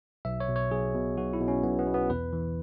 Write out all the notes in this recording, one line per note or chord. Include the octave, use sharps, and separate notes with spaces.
B1 E5
C#5
B2
C#5
B1 G#4
B2
B1 F#4
E4
B2
C#4
B1 B3
B3
B2
B3
E2 B4
E3